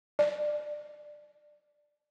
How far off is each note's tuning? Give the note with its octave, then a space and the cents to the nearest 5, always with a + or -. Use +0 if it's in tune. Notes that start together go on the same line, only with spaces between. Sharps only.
D5 +20